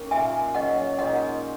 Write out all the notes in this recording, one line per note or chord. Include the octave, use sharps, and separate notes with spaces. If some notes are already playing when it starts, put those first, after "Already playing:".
Already playing: D#3 A#3 C#4
A#2 G#3 D#4 G#4 E5 G#5
F#3 C#4 G#4 D#5 F#5
A#2 G#3 D#4 D#5 F#5